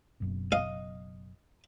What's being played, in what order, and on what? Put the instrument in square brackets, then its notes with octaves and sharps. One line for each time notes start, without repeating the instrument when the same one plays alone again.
[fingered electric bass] F#1 F#2 B2
[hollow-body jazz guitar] D#5 [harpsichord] F5